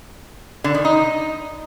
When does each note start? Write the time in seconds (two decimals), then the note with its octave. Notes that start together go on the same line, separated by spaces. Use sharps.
0.64 D3
0.74 D#3
0.85 D#4